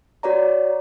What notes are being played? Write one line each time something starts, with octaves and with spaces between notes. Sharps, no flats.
F#4 C#5 D5 A#5